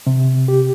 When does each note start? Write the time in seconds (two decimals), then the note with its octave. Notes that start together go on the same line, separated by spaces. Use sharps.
0.07 C3
0.48 G4